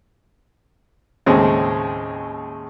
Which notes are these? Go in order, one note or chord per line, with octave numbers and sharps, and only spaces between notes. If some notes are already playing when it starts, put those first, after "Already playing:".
D#2 A2 C#3 G#3 C4 C#4